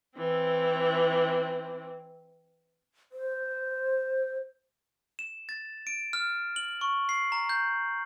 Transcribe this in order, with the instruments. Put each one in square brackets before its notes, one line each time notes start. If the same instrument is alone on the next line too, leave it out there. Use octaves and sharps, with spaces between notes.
[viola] E3 C4
[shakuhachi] C5
[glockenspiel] E7
A6
D7
F6
F#7
C#6
C7
A#5
G6